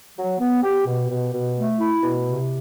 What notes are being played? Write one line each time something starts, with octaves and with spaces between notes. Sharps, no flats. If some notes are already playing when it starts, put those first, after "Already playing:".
F#3
B3
G4
B2
B2
B2
A3
E4
B2
C3